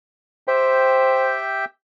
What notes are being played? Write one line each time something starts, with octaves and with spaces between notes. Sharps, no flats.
G4 C5 E5 G5